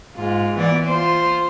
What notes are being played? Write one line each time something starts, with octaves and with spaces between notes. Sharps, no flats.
G#2 F4
E3 B3 D5
F4 C5